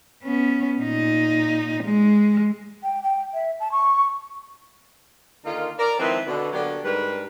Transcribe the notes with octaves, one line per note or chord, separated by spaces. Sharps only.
B3 C#4
A#2 D#4
G#3
G5
G5
E5
A5
C#6
D3 D#3 A#3 D#4 F4
A#4 D5
D#3 F3 G#3 C4 E4 B4
B2 D3
D3 F#3 A#3 B3 D4 G4
G#2 G3 D4 A#4 B4